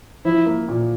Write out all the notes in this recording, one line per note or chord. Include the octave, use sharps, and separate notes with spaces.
F3 E4
A#3
A#2